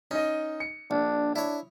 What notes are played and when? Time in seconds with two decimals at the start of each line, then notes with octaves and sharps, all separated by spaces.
0.11 C#4 D#4 D#5
0.60 C#7
0.91 A#1 D4
1.36 D4 E4 C#5